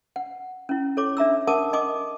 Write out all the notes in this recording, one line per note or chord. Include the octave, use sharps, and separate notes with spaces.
F#5
C#4 E4
A4 C#5 D6
D4 E5 A#5 E6
A#4 F#5 G#5 A5 D6 D#6
D#5 G#5 D6 D#6